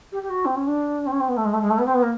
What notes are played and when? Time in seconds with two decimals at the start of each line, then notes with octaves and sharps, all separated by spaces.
0.12 G4
0.22 G4
0.29 F#4
0.45 C4
0.56 C#4
0.67 D4
1.06 C4
1.11 C#4
1.20 C4
1.28 B3
1.37 A3
1.45 G#3
1.53 A3
1.61 G#3
1.70 A3
1.78 B3
1.86 C4
1.94 B3
2.02 A#3